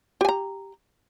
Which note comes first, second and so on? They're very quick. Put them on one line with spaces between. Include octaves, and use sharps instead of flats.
G4 G#5 A#5